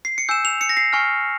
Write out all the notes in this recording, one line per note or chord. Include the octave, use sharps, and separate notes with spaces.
C7
C#7
G#5 E6 G6 E7
F7
C#7
A#6
C7
G#5 C#6 F6